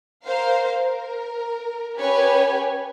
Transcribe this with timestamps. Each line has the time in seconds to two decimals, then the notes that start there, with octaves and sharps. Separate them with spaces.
0.25 A#4 C5 F5
0.77 A#4
1.98 C#4 G4 B4 C#5 G#5